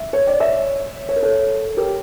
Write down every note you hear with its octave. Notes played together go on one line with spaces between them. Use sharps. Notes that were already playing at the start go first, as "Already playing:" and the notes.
Already playing: E5
C#5
D5
C#5 E5
C#5
A#4
A4 C#5
G4 A#4